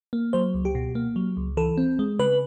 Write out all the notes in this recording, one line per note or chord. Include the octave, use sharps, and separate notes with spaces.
A#3
F#3 C5
C#2
G4
B2
A#3
F#3
C#2
E3 A4
C4
G#3
C#3 B4